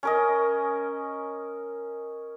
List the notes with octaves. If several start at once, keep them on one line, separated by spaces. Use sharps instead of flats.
C#4 A#4 D#5